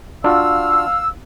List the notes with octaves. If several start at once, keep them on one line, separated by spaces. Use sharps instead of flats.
D4 F4 F#4 F5 E6